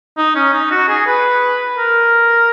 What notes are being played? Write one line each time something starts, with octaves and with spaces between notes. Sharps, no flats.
D#4
C#4
D#4
F#4
G#4
B4
A#4